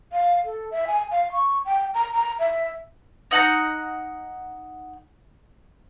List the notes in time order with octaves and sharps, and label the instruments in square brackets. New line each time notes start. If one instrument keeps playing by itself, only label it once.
[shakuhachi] F5
A4
E5
G#5
F5
C#6
G5
A#5
A#5
E5
[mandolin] D#4 F#5 A5 A#5